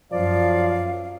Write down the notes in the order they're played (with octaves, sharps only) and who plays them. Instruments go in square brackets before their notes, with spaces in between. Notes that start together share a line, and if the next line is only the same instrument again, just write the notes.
[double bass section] F#2 [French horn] F3 [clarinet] D5 [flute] F5